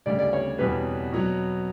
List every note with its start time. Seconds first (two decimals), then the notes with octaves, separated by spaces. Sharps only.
0.06 D2 C#3 G3 D5
0.19 D5
0.33 C#5
0.58 E2 B2 G3 B4
1.12 B2 F#3 B3